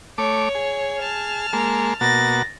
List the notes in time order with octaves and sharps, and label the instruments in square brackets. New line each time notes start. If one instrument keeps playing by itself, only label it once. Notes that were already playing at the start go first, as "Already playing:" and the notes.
[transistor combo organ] A3 D6 [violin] C#5
[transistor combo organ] G#4
[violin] A5 F6
[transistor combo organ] G#3 A#3
[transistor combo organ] B2 A#3 F#4 [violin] A6 A#6